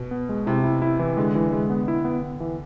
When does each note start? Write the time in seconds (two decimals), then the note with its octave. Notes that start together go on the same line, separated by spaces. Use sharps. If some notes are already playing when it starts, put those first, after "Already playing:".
Already playing: B2
0.11 B3
0.29 G#3
0.47 C3 E4
0.64 E4
0.82 E4
0.99 E3
1.17 D3 G#3
1.35 E3
1.52 G#3
1.70 B3
1.88 E4
2.05 B3
2.23 B3
2.40 E3